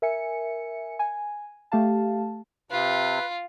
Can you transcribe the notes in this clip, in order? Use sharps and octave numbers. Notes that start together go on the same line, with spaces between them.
A#4 E5 G#5 C#7
G#5
A3 G4 F5 A5
C3 F4 B4